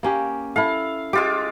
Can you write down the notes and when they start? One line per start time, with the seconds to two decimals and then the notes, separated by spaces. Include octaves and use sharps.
0.03 A#3 C#4 G4
0.56 E4 A4 F5
1.13 G#3 F4 G4 D6